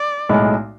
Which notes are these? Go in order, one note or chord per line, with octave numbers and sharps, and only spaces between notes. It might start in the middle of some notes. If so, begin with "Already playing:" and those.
Already playing: D5
B1 A2 G#3